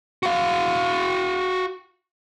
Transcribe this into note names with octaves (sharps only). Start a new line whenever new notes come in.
F#4 F5